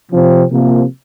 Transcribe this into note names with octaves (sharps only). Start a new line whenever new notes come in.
C3 F3 C4
C3 F3 A#3